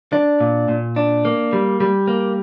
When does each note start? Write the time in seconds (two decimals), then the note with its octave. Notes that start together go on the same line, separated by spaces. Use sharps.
0.13 D4
0.40 A#2
0.68 A#2
0.96 D4
1.25 A#3
1.53 G3
1.80 G3
2.08 A#3